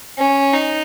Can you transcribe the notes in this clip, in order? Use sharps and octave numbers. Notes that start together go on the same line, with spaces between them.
C#4
D#4